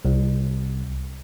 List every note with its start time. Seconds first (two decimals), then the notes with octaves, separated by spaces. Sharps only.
0.05 C2